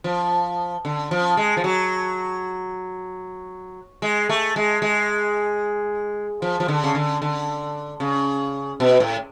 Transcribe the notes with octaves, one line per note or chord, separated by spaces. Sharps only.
F3
D3
F3
G#3
F3
F#3
G#3
A3
G#3
G#3
F3
F3
D3
C#3
D3
D3
C#3
B2
A2